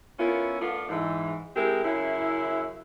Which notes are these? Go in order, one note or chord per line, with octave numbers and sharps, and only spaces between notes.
B3 C#4 E4 F4 A#4
A3 B3 D4 F4
G#2 E3
G#3 C4 E4 G4 A#4
F#2 C#3 E4